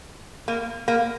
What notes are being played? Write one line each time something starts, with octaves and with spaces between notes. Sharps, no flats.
A#3
A#3